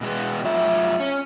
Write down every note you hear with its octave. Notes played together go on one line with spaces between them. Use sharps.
B2 G#3 B3
F#2 F4 E5
C#4